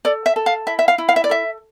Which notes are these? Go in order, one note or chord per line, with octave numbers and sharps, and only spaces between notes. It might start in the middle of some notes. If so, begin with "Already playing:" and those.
A4 D5
E5
A4
F5
E4 E5
E5
F5
E4
F5
E5
D5
A4 E5